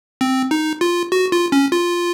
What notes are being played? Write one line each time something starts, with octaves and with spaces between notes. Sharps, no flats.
C4
D#4
F4
F#4
F4
C#4
F4